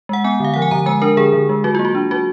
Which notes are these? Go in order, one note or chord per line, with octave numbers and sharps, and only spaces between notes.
G#3 F#5
B3 G#5
D3 F5
F3 F#5
G#5
D3 A#5
G#3 G#5
D4 A#4
D3 G#4
D3
G#3
F#3 F#4
A#3 F4
F#4
D4
F#3 F#4